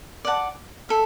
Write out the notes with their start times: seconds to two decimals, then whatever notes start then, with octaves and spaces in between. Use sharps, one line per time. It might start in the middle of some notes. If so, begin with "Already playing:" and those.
0.25 D5 F#5 A5
0.89 A4 E5